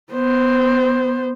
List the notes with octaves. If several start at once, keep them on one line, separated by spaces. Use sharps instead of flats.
B3 C5